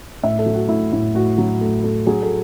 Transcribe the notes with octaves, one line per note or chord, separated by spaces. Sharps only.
A2 E5
A4
F#3
F#4
A2 E4
A2 E4
A2 F#4
F#3
A3
A3
F#3 G#4
A4